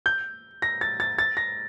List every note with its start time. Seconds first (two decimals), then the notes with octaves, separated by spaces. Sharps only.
0.06 G6
0.62 A#6
0.81 A6
1.00 A6
1.18 A6
1.37 A#6